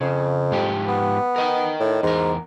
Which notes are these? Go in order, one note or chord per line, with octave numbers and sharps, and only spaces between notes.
F2 C#3
G#2 F3 G4
B3
A#4 D#5 G5
A2
E2 G#2 A#4